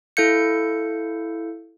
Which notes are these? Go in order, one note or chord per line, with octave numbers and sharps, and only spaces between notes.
E4 A4 F5 G6 C#7